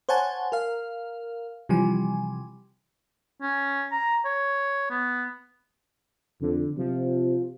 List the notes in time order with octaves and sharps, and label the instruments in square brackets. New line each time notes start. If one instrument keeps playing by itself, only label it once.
[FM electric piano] C5 C#5 F#5 G#5 A5
A#4 F5
C3 E3 F3 G3 G#5
[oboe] C#4
A#5
C#5
B3
[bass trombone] F2 [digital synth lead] D3
[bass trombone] C3 [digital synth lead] F3